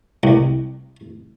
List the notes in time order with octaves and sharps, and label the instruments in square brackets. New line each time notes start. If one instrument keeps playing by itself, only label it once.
[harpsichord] C2